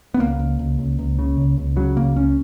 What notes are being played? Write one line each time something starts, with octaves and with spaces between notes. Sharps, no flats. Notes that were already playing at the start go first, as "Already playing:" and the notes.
B3
C#2 A#3
C#2
C#2
C#2
C#2
C#3
C#2
C#2
C#3 F#3
C#2 A#3
C#2 C#4